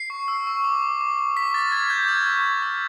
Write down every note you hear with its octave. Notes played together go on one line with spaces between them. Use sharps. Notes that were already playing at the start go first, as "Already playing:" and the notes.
Already playing: C7
C#6
E6
C#6
D6
D6
D6
D6
D6 B6
F6 A6
F6 G#6
D6 G6
E6 G#6
C#6
C#6
E6